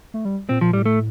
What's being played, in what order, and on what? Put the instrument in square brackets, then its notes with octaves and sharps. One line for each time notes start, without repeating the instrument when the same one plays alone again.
[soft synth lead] A3
G3
[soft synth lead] A#2 [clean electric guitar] C4
[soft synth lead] A#2 [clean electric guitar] F3
[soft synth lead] A2 [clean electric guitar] G3
[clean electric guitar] A3